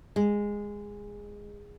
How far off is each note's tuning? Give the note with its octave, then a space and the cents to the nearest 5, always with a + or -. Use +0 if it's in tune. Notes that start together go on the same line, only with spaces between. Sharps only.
G#3 -15